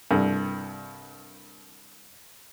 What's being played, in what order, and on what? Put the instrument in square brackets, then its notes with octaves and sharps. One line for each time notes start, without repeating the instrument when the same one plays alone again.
[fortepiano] C2 G2 A4